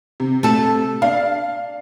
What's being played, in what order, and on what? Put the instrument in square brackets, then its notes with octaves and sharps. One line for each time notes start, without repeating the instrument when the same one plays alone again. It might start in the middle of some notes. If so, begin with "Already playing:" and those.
[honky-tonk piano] C3
[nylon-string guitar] A3 A4
[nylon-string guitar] D4 [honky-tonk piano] F5